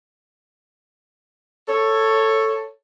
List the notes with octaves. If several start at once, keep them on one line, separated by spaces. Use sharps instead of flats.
A4 C#5